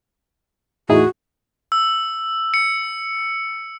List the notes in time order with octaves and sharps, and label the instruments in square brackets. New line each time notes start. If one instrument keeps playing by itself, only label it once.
[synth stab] E2 A2 E3 [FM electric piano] A3 D#4 E4 [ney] F#4 [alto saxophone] G#4
[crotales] E6
C#7